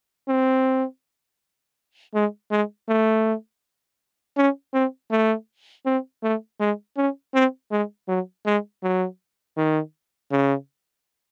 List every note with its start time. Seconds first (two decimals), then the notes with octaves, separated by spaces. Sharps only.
0.28 C4
2.14 G#3
2.51 G#3
2.89 A3
4.37 C#4
4.74 C4
5.11 A3
5.86 C4
6.23 A3
6.60 G#3
6.97 C#4
7.34 C4
7.71 G#3
8.08 F#3
8.46 G#3
8.83 F#3
9.57 D#3
10.31 C#3